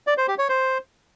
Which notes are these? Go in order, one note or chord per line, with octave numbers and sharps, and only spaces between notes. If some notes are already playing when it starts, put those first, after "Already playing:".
D5
C5
G4
C#5
C5